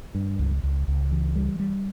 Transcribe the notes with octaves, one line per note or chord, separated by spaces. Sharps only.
G2
C#2
C#2
C#2
E3
G3
G3